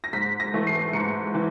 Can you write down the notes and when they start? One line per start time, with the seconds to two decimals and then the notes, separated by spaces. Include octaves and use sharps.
0.04 A#6
0.13 G#2 B6
0.40 A#6
0.54 E3 A3
0.67 C7
0.93 G#2 C#7
1.34 E3